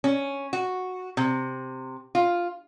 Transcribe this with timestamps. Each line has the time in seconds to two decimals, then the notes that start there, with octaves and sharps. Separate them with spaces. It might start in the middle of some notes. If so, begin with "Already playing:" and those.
0.04 C#4
0.53 F#4
1.17 C3
2.15 F4